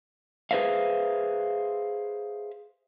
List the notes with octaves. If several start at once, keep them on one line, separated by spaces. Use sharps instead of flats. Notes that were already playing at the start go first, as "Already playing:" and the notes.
G#4 B4 C5 E5 F5